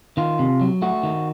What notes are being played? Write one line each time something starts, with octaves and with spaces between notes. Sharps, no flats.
D#3 F4
C3
F#3
A3 F#4
D#3